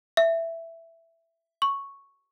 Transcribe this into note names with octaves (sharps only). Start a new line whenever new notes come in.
E5
C#6